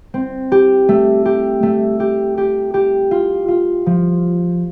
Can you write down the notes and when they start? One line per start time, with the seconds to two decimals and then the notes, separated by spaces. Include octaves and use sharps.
0.14 C4
0.52 G4
0.89 A3
1.25 G4
1.63 A3
2.00 G4
2.38 G4
2.74 G4
3.11 F4
3.48 F4
3.86 F3